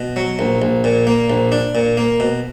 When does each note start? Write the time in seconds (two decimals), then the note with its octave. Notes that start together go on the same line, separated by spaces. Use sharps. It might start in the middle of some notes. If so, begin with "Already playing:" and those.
Already playing: B2
0.16 F#3
0.39 A#1
0.62 A#1
0.84 A#2
1.07 A#3
1.30 A#1
1.52 D4
1.75 A#2
1.97 A#3
2.20 B2